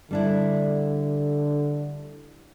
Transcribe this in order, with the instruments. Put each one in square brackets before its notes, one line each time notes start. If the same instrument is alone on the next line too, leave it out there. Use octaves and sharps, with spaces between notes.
[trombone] D3 [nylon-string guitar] G3 D4 E4